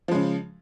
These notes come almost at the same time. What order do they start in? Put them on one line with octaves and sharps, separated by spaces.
F3 G#3 C#3